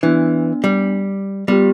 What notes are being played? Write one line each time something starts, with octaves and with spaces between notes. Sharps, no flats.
E3 B3 D4
G3
G3 B3 F4 G4